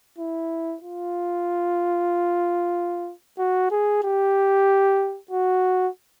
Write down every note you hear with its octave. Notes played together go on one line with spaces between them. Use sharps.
E4
F4
F#4
G#4
G4
F#4